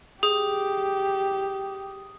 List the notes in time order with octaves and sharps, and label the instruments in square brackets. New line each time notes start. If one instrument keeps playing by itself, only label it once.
[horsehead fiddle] G4 [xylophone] G#4 [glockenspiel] D#6